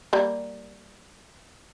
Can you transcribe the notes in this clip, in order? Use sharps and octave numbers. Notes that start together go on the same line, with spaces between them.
G3 A#3